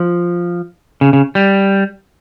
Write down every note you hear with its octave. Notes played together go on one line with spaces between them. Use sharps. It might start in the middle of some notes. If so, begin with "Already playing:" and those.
Already playing: F3
C#3
C#3
G3